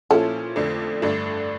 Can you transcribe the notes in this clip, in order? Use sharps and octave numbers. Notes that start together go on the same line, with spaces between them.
A#2 F3 C#4 E4 A4
F2 D3 A3 D4
G2 D3 A3 D4